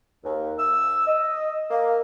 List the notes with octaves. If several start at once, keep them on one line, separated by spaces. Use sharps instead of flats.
D#2
E6
D#5
A#3